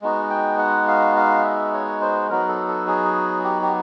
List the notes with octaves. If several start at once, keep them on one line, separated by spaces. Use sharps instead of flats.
G#3 B3 D#4 F#4
G5
F#5
F5
F5
E5
C#5
C5
F#3 B3 D#4 F#4 A#4
A4
A4
G#4
G4
G4